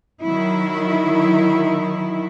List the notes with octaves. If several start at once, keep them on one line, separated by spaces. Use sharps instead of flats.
D#3 F#3 E4